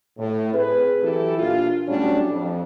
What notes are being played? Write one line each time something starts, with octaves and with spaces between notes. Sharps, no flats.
A2
C4 G#4 B4
E3 F#3 E4 G4 A4
A#2 D4 F4
A2 F#3 G3 C#4 D4
F2